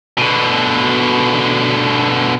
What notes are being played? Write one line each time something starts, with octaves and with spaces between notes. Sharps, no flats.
B2 D3